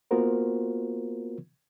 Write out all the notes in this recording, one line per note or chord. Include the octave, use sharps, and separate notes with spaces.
A#3 B3 F4 F#4 A#4 C5